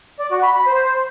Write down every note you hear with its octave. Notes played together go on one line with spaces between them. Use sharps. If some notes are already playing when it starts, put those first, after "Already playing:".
D5
F#4
B5
B5
C5